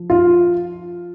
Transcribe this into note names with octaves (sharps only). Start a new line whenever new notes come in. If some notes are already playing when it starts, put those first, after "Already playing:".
Already playing: F3
F4